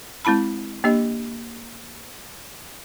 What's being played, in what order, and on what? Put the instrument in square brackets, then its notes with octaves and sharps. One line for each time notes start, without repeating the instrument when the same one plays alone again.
[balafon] G#3 C4 E4 A5 B5
A#3 D4 G4 D#5